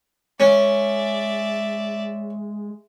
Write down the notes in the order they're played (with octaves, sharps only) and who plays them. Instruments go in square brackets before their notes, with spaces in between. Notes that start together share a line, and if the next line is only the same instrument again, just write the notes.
[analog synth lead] G#3 [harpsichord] C#4 [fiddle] D5 E5